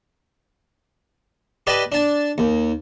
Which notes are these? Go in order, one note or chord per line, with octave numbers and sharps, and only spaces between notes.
G4 B4 D5 D#5 A5
D4 A5
D#2